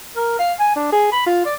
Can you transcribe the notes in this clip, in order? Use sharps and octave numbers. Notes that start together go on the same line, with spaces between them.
A#4
F5
G#5
D4
G#4
B5
F4
D5